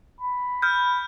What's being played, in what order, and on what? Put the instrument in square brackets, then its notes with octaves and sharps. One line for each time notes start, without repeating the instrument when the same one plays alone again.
[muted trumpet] B5
[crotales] F6 G6